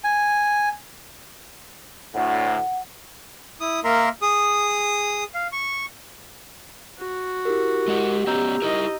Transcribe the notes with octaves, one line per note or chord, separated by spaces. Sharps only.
G#5
D2 A2 F#5
E4 D#6
A#3 A#4 E5 A#5 C6
G#4 D#6
F5
C#6
F#4
E4 G4 A#4
G#3 D#5 F#5
B3 C#4 D#5 A#5 E6 G6
D#4 E4 A#4 D#5